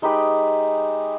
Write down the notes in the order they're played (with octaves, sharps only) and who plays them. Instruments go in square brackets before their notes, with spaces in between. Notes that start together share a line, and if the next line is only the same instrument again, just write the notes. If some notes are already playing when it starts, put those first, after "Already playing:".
[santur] G#3 D#4 G4 B4